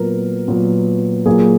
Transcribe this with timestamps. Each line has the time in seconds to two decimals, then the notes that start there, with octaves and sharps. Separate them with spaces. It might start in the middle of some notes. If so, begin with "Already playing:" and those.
Already playing: A#2 F#3 B3 A#4
0.48 A#2 F#3 B3
1.26 A#2 F#3 A#3 G#4